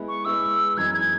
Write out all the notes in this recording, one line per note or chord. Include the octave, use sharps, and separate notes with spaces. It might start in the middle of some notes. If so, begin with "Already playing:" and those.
Already playing: G#3 B3 E4
C#6
G#3 B3 E4 E6
F#2 E3 G#3 D#4 G#6
G#6